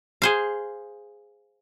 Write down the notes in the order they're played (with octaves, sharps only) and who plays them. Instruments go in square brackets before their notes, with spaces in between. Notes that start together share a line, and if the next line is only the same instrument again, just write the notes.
[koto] G#4 C5 F5